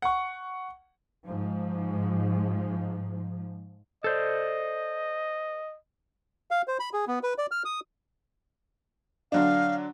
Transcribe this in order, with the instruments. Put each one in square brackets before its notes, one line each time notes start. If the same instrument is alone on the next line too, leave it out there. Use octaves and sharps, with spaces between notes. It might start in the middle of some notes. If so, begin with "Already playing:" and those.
[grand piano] F#5 C#6
[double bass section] G#2 F3
[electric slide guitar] A4 C5 D5 [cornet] D#5
[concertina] F5
C5
B5
G#4
B3
B4
D5
F6
D#6
[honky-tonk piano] D3 F#3 D4 [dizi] F5